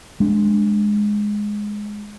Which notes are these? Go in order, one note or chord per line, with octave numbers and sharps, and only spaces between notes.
G#3 D4